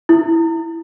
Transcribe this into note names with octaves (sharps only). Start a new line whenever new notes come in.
E4